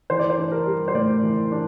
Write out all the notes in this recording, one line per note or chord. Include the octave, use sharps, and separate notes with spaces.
E3 C5
D5
C5
D4
A#4
G3
C5
A2 D5
E3
D4